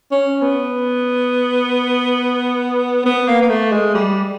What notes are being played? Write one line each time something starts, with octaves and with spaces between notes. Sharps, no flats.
C#4
B3
B3
A#3
A#3
A3
G#3
G3